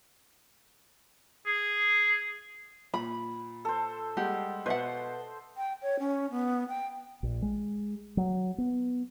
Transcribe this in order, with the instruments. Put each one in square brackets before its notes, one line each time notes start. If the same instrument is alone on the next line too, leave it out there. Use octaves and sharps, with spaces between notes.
[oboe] G#4
[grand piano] A#2 [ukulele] B5
[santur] A4 C5
[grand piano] G3 G#3 F#5 [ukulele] G4
[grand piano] B2 [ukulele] B4 E5 F#5 [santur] C5
[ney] G5
C#5
C#4
B3
G5
[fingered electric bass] A#1
G#3
F#3
B3